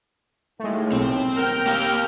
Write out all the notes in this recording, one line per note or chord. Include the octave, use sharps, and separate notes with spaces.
D#2 A2 G#3 A3
B1 C4
A#4 G5 F6 G6
A#3 G4 F5